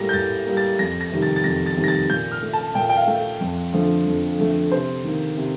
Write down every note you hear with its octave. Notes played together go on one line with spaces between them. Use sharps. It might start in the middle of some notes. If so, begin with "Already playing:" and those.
Already playing: A2 G3 A#3 A#6
G6
A2 A6
G3 A#3
A6
F2 A#6
A#6
C3 D#3 G3
A6
A6
F2 A#6
A6
C3 D#3 G3
A#6
A6
A#2 G6
F6
A3
A5
A#2 G5
G5
F5
A3
F2
D3 F3 A3
F2
D3 F3 A3
C3 C5
D#3 A#3
C3